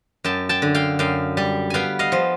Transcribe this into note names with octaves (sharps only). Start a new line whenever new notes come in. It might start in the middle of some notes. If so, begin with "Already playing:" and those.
F#2 G5 A5
G5 A5
D3
F5 G5
F#2 F5 G5
G3
B3 F5 G5 G#5
D#5 F5
F3